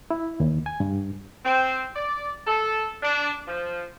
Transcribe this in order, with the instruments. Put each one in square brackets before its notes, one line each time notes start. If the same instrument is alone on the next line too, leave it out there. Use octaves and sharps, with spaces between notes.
[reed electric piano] E4
D#2
G#5
G2
[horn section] C4
D5
A4
D4
F3